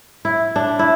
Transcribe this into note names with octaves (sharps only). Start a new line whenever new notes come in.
E4
D4
E4